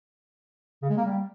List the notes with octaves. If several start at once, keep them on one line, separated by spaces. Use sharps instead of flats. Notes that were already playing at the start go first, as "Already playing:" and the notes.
C#3
G#3
A#3
G3